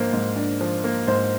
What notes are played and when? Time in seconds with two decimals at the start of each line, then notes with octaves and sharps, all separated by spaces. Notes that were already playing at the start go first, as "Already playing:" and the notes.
Already playing: G#2 F3 A#3 D4 C5
0.13 G#2
0.36 D4
0.61 F3
0.84 A#3
1.07 G#2 C5